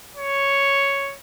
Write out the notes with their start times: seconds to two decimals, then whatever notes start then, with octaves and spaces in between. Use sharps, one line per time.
0.16 C#5